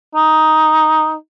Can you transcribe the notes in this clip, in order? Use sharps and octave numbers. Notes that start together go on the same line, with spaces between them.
D#4